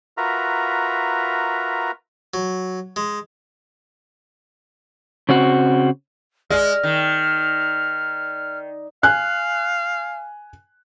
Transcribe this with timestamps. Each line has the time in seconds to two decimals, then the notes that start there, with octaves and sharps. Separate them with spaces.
0.17 F4 F#4 A#4 B4 E5 A#5
2.34 F#3
2.96 G#3
5.29 C#3 C4 F#4
6.50 G#3 D5 F6
6.83 D#3
9.03 F5 G#5 F#6